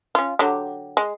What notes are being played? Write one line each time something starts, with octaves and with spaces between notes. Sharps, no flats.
C#4 F4
D3 F#3 G4
G#3